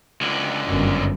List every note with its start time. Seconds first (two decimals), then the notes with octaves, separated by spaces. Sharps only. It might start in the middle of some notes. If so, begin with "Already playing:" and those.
0.21 C#2 D3
0.68 G1 F#2